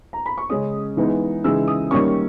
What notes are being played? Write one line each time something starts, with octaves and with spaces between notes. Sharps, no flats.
A#5
B5
C#6
C#3 G#3 C#4 D#6
E3 G#3 B3 D#4
C#3 E3 G#3 D#4 E6
D#6
D#3 G3 A#3 C#4 C#6